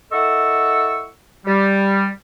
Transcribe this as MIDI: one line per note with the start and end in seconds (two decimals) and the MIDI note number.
0.12 1.07 64
0.12 1.07 69
0.12 1.07 75
0.12 1.07 78
0.12 1.07 85
0.12 1.07 88
1.46 2.07 55